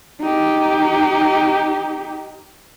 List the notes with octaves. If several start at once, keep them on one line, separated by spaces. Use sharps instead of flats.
D#4 G4